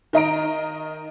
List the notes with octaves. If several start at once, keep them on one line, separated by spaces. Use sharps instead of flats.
D#3 D#5 A#5 D7